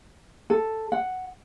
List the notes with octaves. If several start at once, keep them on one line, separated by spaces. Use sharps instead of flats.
A4
F#5